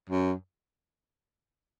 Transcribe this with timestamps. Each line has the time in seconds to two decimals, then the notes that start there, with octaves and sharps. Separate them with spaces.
0.09 F#2